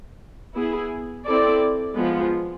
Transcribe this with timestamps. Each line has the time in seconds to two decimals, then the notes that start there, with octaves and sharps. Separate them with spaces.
0.54 B3 E4 G#4
1.24 C4 E4 A4 D5
1.95 F3 G#3 B3